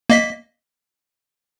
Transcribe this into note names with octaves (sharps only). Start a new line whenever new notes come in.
A#3 D#5 B6